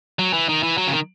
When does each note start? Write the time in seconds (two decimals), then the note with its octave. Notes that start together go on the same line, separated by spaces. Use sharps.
0.19 F#3
0.33 E3
0.49 D#3
0.63 E3
0.78 F#3
0.87 C#3
0.92 D#3